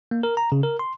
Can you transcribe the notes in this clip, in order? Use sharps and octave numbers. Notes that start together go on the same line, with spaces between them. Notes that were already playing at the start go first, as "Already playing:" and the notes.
A#3
A#4
A#5
C#3
A#4
C6